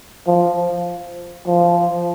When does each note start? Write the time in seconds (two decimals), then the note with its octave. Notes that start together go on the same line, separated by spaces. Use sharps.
0.27 F3
1.47 F3